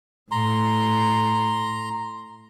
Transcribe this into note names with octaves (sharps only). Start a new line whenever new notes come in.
A2 A#5 C6